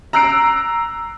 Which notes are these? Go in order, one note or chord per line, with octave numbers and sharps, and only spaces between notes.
A#5 E6 F#6 C7 D7